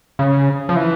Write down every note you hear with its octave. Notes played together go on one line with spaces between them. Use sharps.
C#3
F3
E3